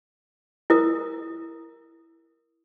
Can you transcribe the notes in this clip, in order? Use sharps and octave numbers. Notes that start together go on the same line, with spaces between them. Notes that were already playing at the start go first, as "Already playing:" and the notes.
E4 A#4 D#6